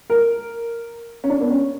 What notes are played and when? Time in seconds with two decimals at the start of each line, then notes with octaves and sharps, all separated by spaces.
0.10 A#4
1.24 C#4
1.30 D4
1.41 B3
1.51 C#4